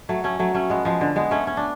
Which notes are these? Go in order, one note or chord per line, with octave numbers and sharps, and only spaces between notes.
F#3 A3
A3 C#4
F#3 A3
A3 C#4
G#3 B3
F3 G#3
D3
G#3 B3
A3 C#4
C#4
D4